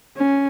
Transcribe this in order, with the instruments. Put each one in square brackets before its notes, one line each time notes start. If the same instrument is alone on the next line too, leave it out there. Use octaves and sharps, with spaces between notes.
[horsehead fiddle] C#4